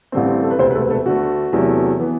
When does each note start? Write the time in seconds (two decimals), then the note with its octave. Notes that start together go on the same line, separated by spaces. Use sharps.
0.12 A1 G2 D3 A3 C4
0.43 A4
0.51 B4
0.59 E1 D2 C3 C4 C5
0.71 B4
0.74 A3 A4
0.90 A3 A4
1.06 D2 D3 A3 F#4
1.53 E2 C3 F#3 A3
1.99 E3 B3